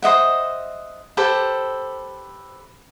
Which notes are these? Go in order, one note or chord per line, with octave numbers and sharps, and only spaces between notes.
C5 D#5 E5 F#5
G4 A4 B4 C5